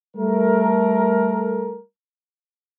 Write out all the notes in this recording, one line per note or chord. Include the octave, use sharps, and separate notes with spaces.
G3 A3 A4 A#4